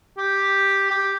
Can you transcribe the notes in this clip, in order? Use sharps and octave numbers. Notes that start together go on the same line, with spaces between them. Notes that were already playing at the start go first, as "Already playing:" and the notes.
G4
G4